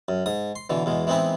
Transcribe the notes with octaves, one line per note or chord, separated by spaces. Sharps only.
F#2
G#2 D#6
C6
B2 D3 E3
E2 B2 G#3
E3 G#3 B3 C4 D#4 E4